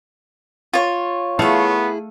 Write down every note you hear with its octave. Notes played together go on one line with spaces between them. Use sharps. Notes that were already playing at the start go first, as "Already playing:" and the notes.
F4 C#5
A3 B3 E4 G#4 A4 F5